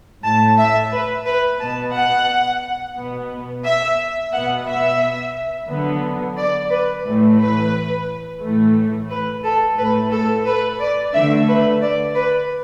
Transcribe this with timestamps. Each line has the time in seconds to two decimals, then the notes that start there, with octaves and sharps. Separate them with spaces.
0.24 A2 A3 A5
0.58 E5
0.92 B4
1.26 B4
1.60 B2 B3 A5
1.95 F#5
2.97 B2 B3
3.65 E5
4.33 B2 B3 F#5
4.67 E5
5.68 D3 F#3 B3
6.37 D5
6.70 B4
7.05 A2 E3 A3
7.39 B4
8.41 A2 E3 A3
9.09 B4
9.44 A4
9.77 A2 A3 B4
10.12 A4
10.46 B4
10.80 D5
11.13 D3 A3 E5
11.48 B4
11.82 D5
12.15 B4